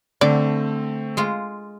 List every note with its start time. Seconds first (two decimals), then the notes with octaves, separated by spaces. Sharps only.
0.21 D3 A3 C4 D5
1.17 G#3 F4 A#5